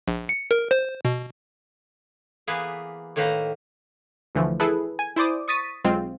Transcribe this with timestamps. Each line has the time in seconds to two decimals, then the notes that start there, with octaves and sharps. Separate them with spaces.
0.08 A#1
0.29 C#7
0.51 A#4
0.71 C5
1.05 B2
2.47 E3 A#3 B3 G#4 B4
3.16 A2 D#3 A#3 B4 C5 A#5
4.35 D2 D3 E3 F3 A3
4.60 E4 G#4 A4 B4
4.99 G#5
5.16 E4 C5 D5 D6 D#6
5.48 C#6 D#6 A6 B6 D#7
5.84 B1 G#3 C4 F4